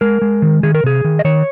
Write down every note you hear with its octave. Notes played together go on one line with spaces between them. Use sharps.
G#3 A#4
G#3
D#3
D#3 G#4
A#4
C3 G#4
D#3
D#5
D#3 C#5